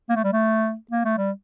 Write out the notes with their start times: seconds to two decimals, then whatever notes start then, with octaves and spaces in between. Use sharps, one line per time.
0.10 A#3
0.16 A3
0.24 G3
0.32 A3
0.91 A#3
1.05 A3
1.18 G3